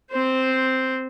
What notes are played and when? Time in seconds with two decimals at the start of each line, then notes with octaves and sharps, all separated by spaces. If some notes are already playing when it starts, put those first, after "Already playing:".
0.11 C4 C5